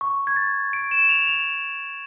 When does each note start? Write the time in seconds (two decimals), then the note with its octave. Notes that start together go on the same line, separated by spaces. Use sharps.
0.01 C#6
0.27 G#6
0.36 A6
0.73 D7
0.91 E7
1.09 F7
1.27 F7